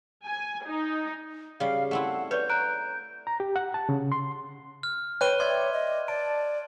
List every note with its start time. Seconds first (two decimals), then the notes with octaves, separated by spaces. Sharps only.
0.24 G#5
0.66 D#4
1.60 C#3 G3 F5
1.91 A3 C4 E4 F#5
2.31 B4 C#5 D5 G6
2.49 A#5 F#6 D7
3.27 A#5
3.40 G4
3.56 F#5
3.74 A5
3.89 C#3
4.12 C6
4.83 F6
5.21 B4 C#5 G5 F#6 D#7 G7
5.40 C#5 D5 E5 C6 G#6
5.73 D#5
6.08 D5 A5 D7